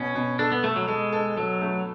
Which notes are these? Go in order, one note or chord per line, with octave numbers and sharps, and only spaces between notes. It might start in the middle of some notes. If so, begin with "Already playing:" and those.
Already playing: B2 C#4
B2
D4 A4
B3
A3 A4
F#3
G#3 A4
A4
F#3 A4
A3